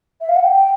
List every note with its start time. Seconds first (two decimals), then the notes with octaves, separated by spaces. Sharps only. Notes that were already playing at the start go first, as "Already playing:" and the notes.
0.20 E5
0.28 F5
0.36 F#5
0.43 G5